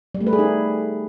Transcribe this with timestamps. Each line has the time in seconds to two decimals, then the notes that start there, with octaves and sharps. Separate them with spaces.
0.15 G3
0.21 A3
0.27 B4
0.33 G#4
0.39 D#4